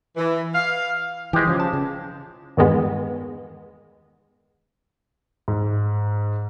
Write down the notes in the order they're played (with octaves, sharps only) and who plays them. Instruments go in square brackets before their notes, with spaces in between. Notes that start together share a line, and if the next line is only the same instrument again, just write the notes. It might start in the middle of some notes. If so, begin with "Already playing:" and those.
[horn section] E3
F5
[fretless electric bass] E3 F3 [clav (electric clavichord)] G#3 G4
[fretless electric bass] C#3 F3
[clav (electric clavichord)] A5
[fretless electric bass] C#3
[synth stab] E2 G2 D#3 G#3 B3
[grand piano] G#2